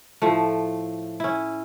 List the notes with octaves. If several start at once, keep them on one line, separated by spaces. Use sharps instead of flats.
A2 F3 A3
C#4 E4